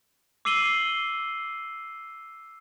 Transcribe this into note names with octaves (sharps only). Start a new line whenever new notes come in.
D6 E6 C7 D#7 F#7 G7